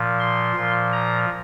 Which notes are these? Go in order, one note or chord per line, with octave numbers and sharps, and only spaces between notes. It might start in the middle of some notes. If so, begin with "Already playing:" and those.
Already playing: A#2 F3
C6
A#2 F3
A#5